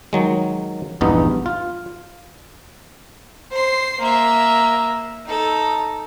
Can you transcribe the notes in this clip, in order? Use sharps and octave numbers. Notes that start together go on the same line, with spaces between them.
D#3 F#3 G#3
A#1 E2 G2 B3 D#4
F4
C5 C6
A#3 E5
D#4 A4